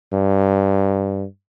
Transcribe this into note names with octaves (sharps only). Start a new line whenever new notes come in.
G2